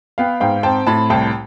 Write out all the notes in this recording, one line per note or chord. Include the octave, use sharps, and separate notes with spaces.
B3 F5 G5
G#2 F5 G5
C4 G5 A5
A2 A5 B5
C2 G5 A5